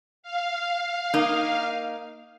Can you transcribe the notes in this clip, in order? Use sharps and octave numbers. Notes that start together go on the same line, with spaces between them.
F5
A#3 D#4